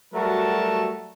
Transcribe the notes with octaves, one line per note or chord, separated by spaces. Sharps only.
F#3 G3 A3 F#4 A#4 A5